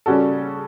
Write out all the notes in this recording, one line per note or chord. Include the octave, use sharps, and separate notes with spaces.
C#3 G3 C#4 F#4 A4